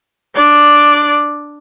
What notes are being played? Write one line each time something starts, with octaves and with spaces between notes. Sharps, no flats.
D4 D5